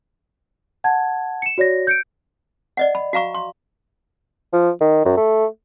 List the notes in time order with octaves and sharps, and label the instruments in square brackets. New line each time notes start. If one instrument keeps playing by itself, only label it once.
[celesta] F#5 A5 G#6
C#7 E7
F#4 C#5 D5 A#6
G6 C#7 D7
[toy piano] D5 D#5 F#5
B5
F#4 F5 A#5 C#6
C6
[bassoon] F3
D#3
F#2
A3